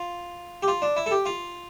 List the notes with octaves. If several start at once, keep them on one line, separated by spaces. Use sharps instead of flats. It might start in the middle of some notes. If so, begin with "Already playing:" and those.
Already playing: F4
G4
F4
D4
E4
A4
G4
F4